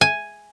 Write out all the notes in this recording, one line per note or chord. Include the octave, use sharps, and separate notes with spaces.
G#5